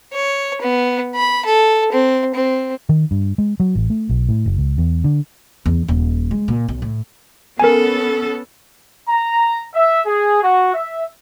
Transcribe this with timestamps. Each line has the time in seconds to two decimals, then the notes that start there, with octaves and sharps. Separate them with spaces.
0.13 C#5
0.61 B3
1.16 B5
1.45 A4
1.92 C4
2.35 C4
2.89 D#3
3.11 G2
3.38 G#3
3.60 F#3
3.75 A1
3.90 A3
4.09 B1
4.29 A2
4.46 F#1
4.58 C#2
4.78 E2
5.04 D3
5.66 E2
5.88 D#1
6.31 G#3
6.48 A#2
6.68 B1
6.82 A2
7.60 B3 C#4 A4 A#4 G#5
9.08 A#5
9.73 E5
10.06 G#4
10.43 F#4
10.73 E5